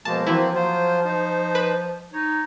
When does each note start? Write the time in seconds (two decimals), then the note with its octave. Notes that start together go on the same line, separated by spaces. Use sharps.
0.05 B2 F3 G#3 A#3 A5
0.27 E3 F#3 A#3 C4 E4
0.55 F#3 F4 C5
1.04 D#4 C5
1.55 B4
2.13 D#4 C#5